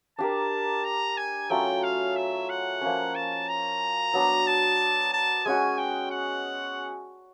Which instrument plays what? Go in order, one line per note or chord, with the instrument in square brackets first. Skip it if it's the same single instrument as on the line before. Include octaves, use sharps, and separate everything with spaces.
[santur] D4 G4 A#4 [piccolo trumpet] A5
[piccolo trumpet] A#5
G#5
[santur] F#3 A3 C#4 F4 [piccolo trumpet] G5
[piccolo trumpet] F5
E5
F#5
[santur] F3 A#3 C#4
[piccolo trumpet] A5
A#5
[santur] F#3 B3 D4
[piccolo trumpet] A5
A5
[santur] G#3 C#4 F#4 [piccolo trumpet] G#5
[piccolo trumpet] G5
F#5